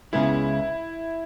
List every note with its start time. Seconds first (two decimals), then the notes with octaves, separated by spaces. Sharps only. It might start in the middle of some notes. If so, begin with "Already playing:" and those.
0.13 C#2 C#3 G#3 B3 E4